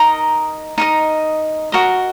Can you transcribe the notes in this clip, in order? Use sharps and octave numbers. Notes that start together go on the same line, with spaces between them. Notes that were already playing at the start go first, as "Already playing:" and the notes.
Already playing: D#4 A#4 D#5 A#5
D#4 A#4 D#5
F#4 A#4 D#5